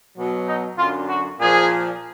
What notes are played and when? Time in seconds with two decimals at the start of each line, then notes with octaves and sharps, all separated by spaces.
0.15 B2 F#3
0.47 D#4
0.77 F#2 D3 F#3 F4
1.09 F#4
1.40 A#2 F3 G#4